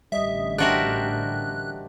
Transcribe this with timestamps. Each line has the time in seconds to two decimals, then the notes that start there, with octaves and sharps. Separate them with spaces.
0.12 A1 D3 G3 D#5 E5
0.58 D4 F#4 G4 A#4 C5 E5 F#6